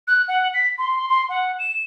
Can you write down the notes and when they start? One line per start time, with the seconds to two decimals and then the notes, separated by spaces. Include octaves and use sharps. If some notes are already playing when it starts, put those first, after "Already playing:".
0.08 F#6
0.28 F#5
0.54 B6
0.78 C6
1.09 C6
1.29 F#5
1.59 E7